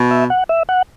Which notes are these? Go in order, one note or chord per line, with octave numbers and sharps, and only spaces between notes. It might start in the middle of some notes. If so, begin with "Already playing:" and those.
Already playing: B2
E5
F#5
E5
F#5